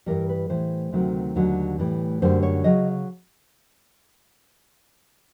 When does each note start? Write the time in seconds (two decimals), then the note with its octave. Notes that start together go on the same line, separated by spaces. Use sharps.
0.06 G2 E3 G3 A#4
0.29 B4
0.50 A2 E3 G3 C5
0.92 D2 C3 D#3 F#3
1.36 D#2 D3 F#3
1.78 A2 E3 G3
2.22 F#2 D3 G3 C5
2.43 C#5
2.64 C#3 F#3 D#5